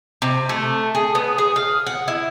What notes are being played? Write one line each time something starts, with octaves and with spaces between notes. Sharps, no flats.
C3
A3
G#4
B3
G#4
F5
F#5
E4